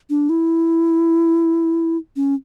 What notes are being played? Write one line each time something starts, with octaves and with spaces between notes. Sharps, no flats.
D4
E4
C#4